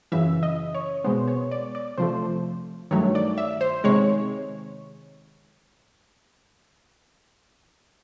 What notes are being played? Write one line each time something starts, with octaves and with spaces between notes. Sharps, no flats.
F#2 C#3 E3 E5
D#5
C#5
B2 G#3 B3 C5
C#5
D5
D5
C3 F3 A3 C5
G2 D#3 F#3 A3 C#5
D5
E5
C5
C3 D#3 G#3 C#5